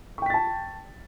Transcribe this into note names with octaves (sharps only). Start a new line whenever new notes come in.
G5 A5 C#6 A6 B6